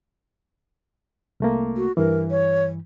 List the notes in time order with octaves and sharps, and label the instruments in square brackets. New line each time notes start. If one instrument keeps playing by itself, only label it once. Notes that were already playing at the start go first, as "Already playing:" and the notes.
[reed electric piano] C2 A3 A#3
[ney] F#4
[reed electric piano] G2 E3 [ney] A#4
[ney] C#5